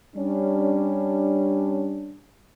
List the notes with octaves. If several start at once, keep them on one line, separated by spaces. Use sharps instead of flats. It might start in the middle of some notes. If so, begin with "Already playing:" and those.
G3 C#4 D4